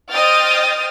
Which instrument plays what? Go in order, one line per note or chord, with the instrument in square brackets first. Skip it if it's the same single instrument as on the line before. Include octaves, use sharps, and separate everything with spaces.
[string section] C5 D#5 G5 D#6 F6 A6